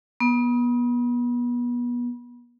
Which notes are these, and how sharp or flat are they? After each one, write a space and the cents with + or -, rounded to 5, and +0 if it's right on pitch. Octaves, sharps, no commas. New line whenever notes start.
B3 -30